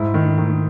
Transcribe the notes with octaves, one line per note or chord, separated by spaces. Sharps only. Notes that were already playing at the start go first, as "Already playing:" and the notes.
Already playing: G#2 E4
D#3
D#3